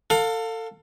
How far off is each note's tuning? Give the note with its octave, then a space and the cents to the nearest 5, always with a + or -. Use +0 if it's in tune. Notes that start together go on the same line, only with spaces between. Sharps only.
A4 +30 F5 +25